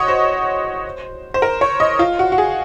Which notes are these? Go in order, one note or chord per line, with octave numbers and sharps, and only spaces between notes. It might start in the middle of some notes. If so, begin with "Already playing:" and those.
Already playing: F#4 C#5 D#5
C5
C5
A#4
C#5
D#5
F4
F#4
F#4
G#4